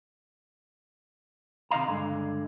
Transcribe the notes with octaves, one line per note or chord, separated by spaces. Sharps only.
C3 D#3 D#5 F5 A#5
C#2 G2 D3 G#3